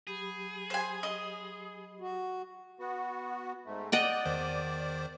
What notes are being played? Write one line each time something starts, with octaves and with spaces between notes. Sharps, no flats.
F#3 G4 G#4 B5
C5 G#5
D#5
F#4
B3 F#4
G#2 A3
D5 D#5 F#5 G5
E2 D#3 C5